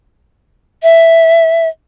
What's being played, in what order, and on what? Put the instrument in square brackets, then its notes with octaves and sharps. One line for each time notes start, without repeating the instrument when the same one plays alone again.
[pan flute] E5